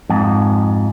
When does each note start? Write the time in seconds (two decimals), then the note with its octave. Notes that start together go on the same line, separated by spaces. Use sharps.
0.10 F2 G#2